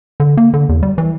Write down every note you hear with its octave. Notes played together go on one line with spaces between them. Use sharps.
D3
A#3
D3
E2
G3
E3